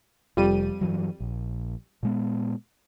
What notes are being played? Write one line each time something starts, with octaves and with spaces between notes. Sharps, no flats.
F1 F2 G3 D#7
G2 E3 F#3
A#1
A#2 G#3 B3